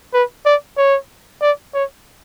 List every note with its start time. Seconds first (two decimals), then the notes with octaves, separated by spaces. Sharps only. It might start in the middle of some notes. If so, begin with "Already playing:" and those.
0.14 B4
0.45 D5
0.77 C#5
1.42 D5
1.74 C#5